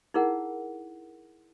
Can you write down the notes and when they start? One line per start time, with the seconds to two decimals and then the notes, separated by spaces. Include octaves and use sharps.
0.14 D#4 E4 G#4 A#4 F#5